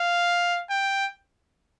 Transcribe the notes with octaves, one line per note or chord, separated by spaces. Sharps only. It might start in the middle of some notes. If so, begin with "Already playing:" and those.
Already playing: F5
G5